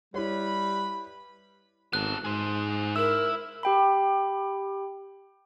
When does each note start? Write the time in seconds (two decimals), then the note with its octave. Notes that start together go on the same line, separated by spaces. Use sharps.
0.14 G3 E4 B4 C#5 B5
1.93 G#1 B3 A4 F#6
2.25 G#2 G#4 C5
2.96 E4 A#4 E6
3.63 G4 G5 B5